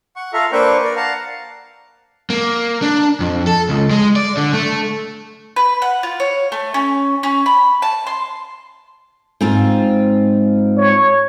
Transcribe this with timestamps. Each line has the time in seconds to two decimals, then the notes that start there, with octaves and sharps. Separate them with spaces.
0.16 F#5 C#6
0.33 F4 A4 E5 F5 A#5
0.52 A#3 D4 B4 C5 G5 C#6
0.83 A#4 D5
0.96 F5 F#5 A5 A#5
2.30 A#3
2.82 D4
3.20 F2
3.47 A4
3.69 C#2
3.91 G#3
4.16 D5
4.37 D3
4.54 A3
5.56 B4
5.82 F#5
6.03 F4
6.20 C#5
6.52 A3
6.74 C#4
7.23 C#4
7.46 B5
7.82 A5
8.07 C6
9.41 G#2 C4 F4
10.77 C#5